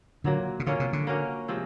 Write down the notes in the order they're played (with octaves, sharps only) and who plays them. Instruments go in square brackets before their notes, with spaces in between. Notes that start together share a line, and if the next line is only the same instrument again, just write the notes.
[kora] A#2 F#3 A#3 [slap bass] D3
[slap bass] C#3
[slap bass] D3 [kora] A#3 C#4 F4
[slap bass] C3
D3
[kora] A#3 C#4 F#4 A#4
C3 F3 G#3 C4